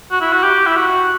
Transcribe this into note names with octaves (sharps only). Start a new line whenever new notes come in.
F#4
E4
F#4
G4
E4
F#4